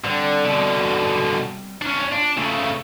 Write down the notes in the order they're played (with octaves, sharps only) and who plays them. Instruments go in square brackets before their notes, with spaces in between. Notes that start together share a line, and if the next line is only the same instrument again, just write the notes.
[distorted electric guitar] D3 [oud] G3 C4
[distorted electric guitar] B2 D3
C#4 D4
[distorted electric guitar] D4 [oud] F4
[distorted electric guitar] C#3 A3